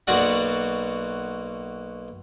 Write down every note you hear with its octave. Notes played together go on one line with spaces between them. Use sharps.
B1 A#3 F#4 D5 F#5